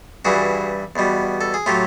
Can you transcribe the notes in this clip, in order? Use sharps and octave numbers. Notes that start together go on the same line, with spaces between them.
G2 E3 G3 F#4 G#4
E2 B2 G3
A4
G#4
A2 F#3 F4 G4